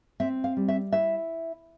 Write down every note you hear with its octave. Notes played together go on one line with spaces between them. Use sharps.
C4 E5
F5
G3
E5
E4 E5